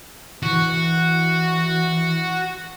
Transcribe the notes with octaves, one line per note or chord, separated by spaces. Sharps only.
E3 F#4